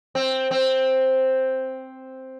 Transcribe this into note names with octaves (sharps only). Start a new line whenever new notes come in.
C4
C4